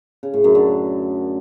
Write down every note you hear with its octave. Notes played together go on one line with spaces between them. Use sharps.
C#3
A2
F#2
D3